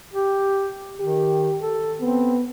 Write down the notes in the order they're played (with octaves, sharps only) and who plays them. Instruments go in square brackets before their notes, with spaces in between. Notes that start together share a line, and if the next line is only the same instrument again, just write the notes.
[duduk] G4
[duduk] D#3 [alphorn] G4
[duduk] A4
[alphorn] B3 [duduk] C4